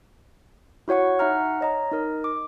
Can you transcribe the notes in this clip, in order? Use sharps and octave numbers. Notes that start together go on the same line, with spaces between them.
E4 F#4 C#5 F#5 C#6
D#4 E5 F#5 A#5 F6
C#5 D#5 A#5
D#4 A#4 D#5
D6